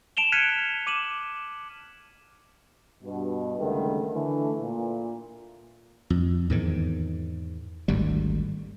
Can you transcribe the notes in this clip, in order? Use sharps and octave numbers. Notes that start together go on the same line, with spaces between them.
A5 D7 E7 F7 G7
F6 F#6 G#6 B6 C#7 D#7
D6 D#7 E7 F#7
G2 B2
C#2 G2 D3 D#3 A3
D3 E3 A3
A#2
F2
E2 G#2 D#3
G#1 D2 G3